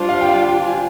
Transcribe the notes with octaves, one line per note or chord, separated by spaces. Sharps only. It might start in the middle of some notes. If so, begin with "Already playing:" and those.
Already playing: G3 D4 F4 C5
F5
G5
F5
G5
G#5